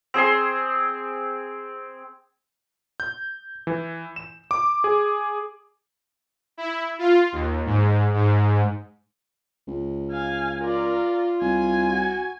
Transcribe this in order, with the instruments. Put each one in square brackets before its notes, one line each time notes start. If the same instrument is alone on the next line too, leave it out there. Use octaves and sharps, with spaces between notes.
[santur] C4 G#4 G#5 C6
[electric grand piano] G6
E3
E7
D6
G#4
[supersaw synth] E4
F4
D#2
G#2
G#2
[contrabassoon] C#2
[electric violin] F5 G#5
[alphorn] F4 [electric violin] A#4 D5
[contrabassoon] C2 [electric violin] G#5
[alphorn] F#4